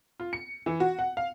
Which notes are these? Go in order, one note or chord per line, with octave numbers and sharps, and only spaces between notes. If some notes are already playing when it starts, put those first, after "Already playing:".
F4
C#7
E3
F#4
F#5
F5